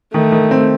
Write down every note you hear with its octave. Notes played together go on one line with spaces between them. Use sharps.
D#3 A3
D#3
C4